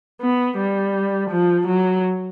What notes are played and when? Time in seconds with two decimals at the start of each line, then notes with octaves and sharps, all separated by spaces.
0.21 B3
0.57 G3
1.30 F3
1.67 F#3